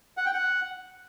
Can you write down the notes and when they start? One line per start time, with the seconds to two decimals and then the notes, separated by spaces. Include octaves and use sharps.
0.17 F#5
0.26 G5
0.34 F#5